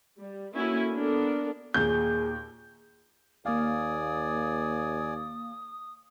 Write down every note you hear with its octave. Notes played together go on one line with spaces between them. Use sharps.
G3
A#3 C#4 E4 F#4 A4 G#5
B3 D4 A4 A#4
D#2 A#2 G#4 G6
D#2 A#3 D5 F5 G#5 D#6